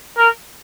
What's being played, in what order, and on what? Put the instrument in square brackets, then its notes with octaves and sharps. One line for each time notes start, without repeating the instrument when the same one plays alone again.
[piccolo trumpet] A#4